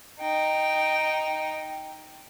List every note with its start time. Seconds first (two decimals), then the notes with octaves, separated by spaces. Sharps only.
0.20 D#4 G5